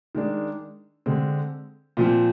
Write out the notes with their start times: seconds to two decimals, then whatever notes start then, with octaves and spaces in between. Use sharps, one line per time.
0.15 D#3 G#3 D4
1.06 D3 G#3 C4
1.97 A#2 F3 C4